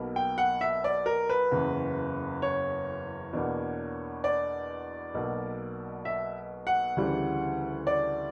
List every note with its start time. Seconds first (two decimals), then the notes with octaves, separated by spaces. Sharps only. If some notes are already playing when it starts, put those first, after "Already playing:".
Already playing: B1 B2 A#3
0.16 G5
0.38 F#5
0.61 E5
0.84 D5
1.06 A#4
1.29 B4
1.51 F#1 E2 C#3
2.42 C#5
3.33 E2 B2 A#3 D4
4.24 D5
5.14 B1 B2 A#3
6.05 E5
6.67 F#5
6.97 D2 C#3 E3 G3
7.87 D5